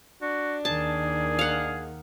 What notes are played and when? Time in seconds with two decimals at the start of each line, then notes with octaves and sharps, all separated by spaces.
0.22 D4 F#4
0.65 D#2 D#3 G#4 A5
1.39 F5 F#5